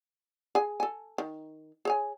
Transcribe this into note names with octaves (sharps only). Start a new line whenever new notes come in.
G#4 G#5
A4 G#5
D#3
G#4 C#5 G#5